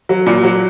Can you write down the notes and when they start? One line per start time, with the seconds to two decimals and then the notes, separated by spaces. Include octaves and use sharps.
0.09 F#3
0.26 A#2
0.43 F#3